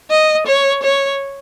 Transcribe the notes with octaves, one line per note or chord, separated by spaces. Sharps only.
D#5
C#5
C#5